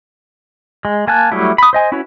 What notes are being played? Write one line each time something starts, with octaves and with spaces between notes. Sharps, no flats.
G#3
A#3 G#5 A5 F#6
F#3 G3 A3 E4
B5 D#6
C5 D#5 G#5
C#4 E4 F#4 B4 C#5